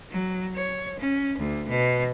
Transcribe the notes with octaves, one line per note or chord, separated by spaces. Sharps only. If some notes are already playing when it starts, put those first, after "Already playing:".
F#3
C#5
C#4
D2
B2